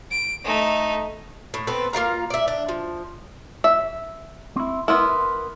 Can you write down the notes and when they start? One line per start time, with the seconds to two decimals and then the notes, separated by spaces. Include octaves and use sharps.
0.11 D7
0.44 A3 D#4
1.54 A2
1.67 B3 C4 A4 B4
1.93 A#3 F4 F5 A#5
2.30 D5 E5
2.48 D4
2.68 F3
3.64 E5
4.56 C4 E4
4.88 B3 E4 A#4 C6